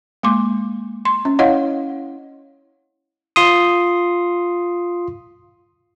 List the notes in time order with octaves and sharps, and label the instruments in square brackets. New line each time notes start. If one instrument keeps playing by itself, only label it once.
[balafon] G#3 A#3 C6 D6
C6
C#4
E4 C#5 D#5 F5 F#5
[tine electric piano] F4 C6 D#6